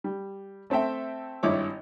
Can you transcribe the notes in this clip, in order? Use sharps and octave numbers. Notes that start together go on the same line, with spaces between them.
G3
A3 C4 A4 E5 G5
G#1 G2 E4 C#5 D6